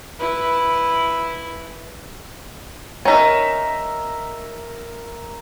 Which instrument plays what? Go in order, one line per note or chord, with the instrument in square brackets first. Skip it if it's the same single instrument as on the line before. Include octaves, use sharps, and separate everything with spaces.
[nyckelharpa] E4 B4
[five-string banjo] C#4 D#4 [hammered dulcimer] A#4 E5 A#5